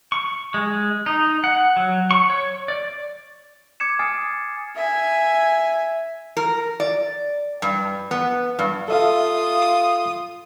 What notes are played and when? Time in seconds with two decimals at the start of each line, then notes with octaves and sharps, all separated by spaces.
0.12 C#6
0.54 G#3
1.06 D#4
1.44 F#5
1.77 F#3
2.11 C#6
2.30 C#5
2.68 D5
3.80 D6 G#6 C#7 E7
3.99 G#5 D#6 F6 A6 C7
4.76 E5 G#5
6.37 A#4
6.80 D5
7.62 G2
8.11 B3
8.59 G2
8.88 F4 A4 E5 F5 D#6